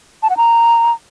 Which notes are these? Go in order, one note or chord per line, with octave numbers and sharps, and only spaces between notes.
A5
F#5
A#5